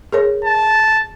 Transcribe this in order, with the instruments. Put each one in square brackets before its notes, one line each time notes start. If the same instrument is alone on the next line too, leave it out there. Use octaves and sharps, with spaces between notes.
[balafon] G#4 A#4 C#5
[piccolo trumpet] A5